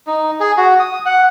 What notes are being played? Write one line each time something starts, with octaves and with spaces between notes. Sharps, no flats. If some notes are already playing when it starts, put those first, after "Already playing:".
D#4
G#4
F#4
D#6
F#5